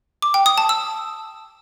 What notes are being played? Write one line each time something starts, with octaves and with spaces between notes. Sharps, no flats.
D6
G5
D#6
A5
E6